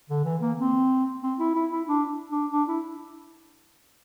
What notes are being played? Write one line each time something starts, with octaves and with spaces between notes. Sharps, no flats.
D3
E3
A#3
C4
C4
E4
E4
E4
D4
D4
D4
E4